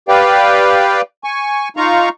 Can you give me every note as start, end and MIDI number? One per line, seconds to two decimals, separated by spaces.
0.08 1.01 67
0.08 1.01 71
0.08 1.01 74
0.08 1.01 77
0.08 1.01 79
1.24 1.69 80
1.24 1.69 85
1.77 2.09 63
1.77 2.09 65
1.77 2.09 77
1.77 2.09 82
1.77 2.09 85